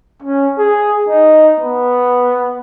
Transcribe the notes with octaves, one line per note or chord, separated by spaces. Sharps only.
C#4
G#4
D#4
B3